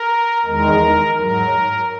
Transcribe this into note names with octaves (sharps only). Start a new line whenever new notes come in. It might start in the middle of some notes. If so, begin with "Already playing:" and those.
Already playing: A#4
E2 D#3 G#3 A#4
G#2 F#3 A#4